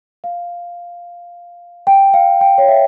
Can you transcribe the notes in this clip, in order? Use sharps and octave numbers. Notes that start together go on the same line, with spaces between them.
F5
G5
F5
G5
C#5
E5